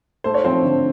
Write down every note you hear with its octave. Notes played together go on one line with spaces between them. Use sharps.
A3 C5
C#5
F3 C4 C5
D3